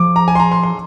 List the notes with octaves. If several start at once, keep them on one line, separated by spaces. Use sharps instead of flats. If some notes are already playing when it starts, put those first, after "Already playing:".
Already playing: F3 D6
A#5
G#5
C6
A#5
C6
C6